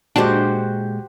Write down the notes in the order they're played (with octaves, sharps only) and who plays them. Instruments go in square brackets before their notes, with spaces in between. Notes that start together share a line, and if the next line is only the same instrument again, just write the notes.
[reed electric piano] A#2 G#3 G6 [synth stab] D4 [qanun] F#4 G4 C5